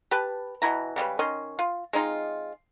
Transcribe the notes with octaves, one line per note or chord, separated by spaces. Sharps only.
G4 B4 A5
B2 E3 E4 A#5
C#3 G3 G#3 B4
D#3 C#4 D#5 C6
F4
G#3 C4 D#4 F4